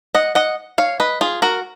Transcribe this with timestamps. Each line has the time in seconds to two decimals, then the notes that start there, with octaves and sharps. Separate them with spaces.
0.15 D#5 F#5
0.35 D#5 F#5
0.78 C#5 F5
1.00 B4 D#5
1.21 F4 G#4
1.42 F#4 A#4